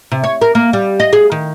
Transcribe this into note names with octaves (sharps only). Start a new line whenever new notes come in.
C3
C#5
A#4
A#3
G3
D#5
G#4
D#3